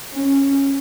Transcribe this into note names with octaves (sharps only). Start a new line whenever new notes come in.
C#4